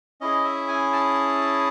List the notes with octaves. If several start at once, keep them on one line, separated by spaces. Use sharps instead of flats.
C#4 E4 G#4 D#5
E5
G#5
A5